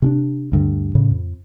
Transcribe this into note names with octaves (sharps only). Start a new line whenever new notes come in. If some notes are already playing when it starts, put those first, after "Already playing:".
C3 C#4 D4
D2 G2 D3
A2 C#3
F2